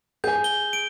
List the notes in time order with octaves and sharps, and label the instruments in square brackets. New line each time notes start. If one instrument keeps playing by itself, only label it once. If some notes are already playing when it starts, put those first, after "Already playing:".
[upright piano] G#4 G#5 [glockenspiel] G6
[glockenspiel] G7
D7